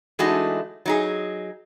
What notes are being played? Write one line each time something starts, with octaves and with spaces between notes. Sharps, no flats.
E3 G#3 A3 D4 D#4 F#4
F#3 D#4 G#4